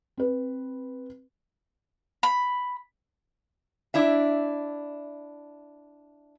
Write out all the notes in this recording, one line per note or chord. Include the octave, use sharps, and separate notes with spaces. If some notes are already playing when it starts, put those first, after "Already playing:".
C4 B4
B5
D4 E4 E5